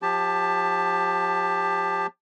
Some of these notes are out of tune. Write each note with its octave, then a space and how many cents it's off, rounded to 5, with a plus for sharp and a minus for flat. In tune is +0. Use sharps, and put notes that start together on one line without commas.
F3 +40 G4 +20 A5 +0